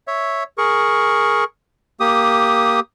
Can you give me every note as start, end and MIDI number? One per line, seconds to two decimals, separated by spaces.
0.07 0.43 73
0.07 0.43 76
0.58 1.44 68
0.58 1.44 70
0.58 1.44 85
2.00 2.80 58
2.00 2.80 67
2.00 2.80 87